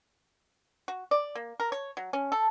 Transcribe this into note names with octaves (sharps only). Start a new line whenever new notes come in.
F#4
D5
A#3
A#4
C#5
F#3
C#4
A4